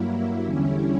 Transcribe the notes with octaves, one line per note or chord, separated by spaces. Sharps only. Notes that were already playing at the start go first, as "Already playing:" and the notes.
Already playing: G2 F#3 A#3 E4
E2 D3 G3 C#4 E4